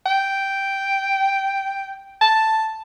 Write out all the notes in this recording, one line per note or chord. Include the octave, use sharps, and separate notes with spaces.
G5
A5